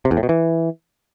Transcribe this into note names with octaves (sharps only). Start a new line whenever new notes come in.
C3
E2
A2
B2
E3